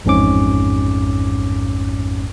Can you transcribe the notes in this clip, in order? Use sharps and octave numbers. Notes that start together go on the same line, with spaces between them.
A1 F2 G#2 C#4 D6